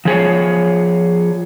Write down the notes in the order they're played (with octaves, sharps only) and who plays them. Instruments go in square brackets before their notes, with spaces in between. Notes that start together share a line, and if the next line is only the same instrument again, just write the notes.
[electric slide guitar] F3 G#4 C#5